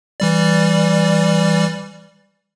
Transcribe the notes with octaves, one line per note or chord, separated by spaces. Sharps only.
E3 G3 D5